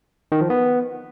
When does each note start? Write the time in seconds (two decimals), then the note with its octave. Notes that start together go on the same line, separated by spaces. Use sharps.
0.32 D#3
0.41 F3
0.50 B3